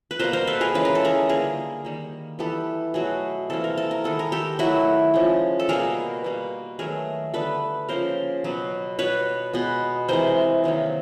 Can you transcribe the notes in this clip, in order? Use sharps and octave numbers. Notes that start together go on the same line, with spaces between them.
B4
B2 G3 A#3 A#4 C5
A#4 C5
A4 B4
G#4 A#4
C#3 E3 G#3 B4
A#4
A4
G#4 A#4
D3 G3 A#3 G#4 A#4
D#3 G3 A#3
E3 G3 B3 G4 A4
B2 F#3 A3 F#4 G#4
C3 E3 G3 A#3 A4
A#4
A4
A#4
D#3 G#3 B3 A4
A#4
G4 A4
D#3 F#3 A3 E4 F#4
C#3 F3 G#3
A4
B2 G3 A#3 G#4 A#4
B2 G3 A#3
D#3 F#3 A3 G#4 A#4
D3 G3 B3 A4 B4
C#3 F3 A#3 A#4 C5
B2 F#3 B3
B2 G3 B3 B4 C#5
B2 G#3 B3
C3 E3 G#3 A#4 C5
C3 D#3 F#3 A#3